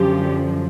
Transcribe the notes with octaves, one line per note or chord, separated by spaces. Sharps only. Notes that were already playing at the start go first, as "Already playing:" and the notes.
Already playing: F#2 D3 F3 G4